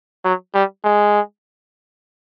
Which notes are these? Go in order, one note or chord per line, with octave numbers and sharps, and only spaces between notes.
F#3
G3
G#3